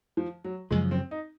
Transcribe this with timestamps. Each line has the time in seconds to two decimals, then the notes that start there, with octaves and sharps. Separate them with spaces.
0.17 F3
0.44 F#3
0.71 F#2 C#3 F3 G#3
0.91 C4
1.11 D#4